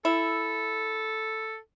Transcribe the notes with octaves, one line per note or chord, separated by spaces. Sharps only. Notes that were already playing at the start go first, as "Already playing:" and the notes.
E4 A4